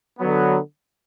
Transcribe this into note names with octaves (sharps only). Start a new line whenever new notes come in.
D3 F#3 B3